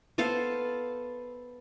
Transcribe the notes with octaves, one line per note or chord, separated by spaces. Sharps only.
B3 A4 C5 F5